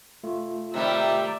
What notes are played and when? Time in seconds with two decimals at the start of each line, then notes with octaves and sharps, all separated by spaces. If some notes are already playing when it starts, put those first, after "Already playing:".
0.24 A3 F4
0.74 C3 D#3 G3 D5 E5